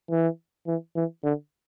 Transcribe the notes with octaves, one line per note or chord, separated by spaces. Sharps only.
E3
E3
E3
D3